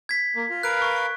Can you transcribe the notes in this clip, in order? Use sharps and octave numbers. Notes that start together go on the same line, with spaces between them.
G#6 B6
A#3
F4
A#4 B4 F5 F#6 D7
C#6
C#6